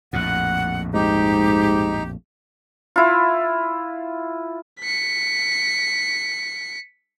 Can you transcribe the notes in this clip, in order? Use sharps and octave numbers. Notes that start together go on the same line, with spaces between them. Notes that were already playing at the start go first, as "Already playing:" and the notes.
A#1 F2 A2 F#5
G#2 D#4 G4
E4 F4
B6 C#7